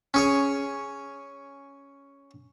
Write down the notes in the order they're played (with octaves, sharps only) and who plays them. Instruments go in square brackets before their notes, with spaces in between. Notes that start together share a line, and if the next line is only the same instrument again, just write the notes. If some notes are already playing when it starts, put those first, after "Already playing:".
[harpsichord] C#4 G#4 C#5